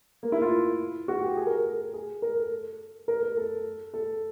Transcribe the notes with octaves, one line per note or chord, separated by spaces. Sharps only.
A#3
E4
F4
F#4
G4
G#4
A#4
A4
G#4
A#4
A4
A#4
A#4
A4
A4